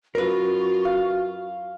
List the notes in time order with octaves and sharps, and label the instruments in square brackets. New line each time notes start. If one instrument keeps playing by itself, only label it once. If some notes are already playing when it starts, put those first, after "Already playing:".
[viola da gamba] F#2 F4 [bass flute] F#4 [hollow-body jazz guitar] A#4 B4
[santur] F5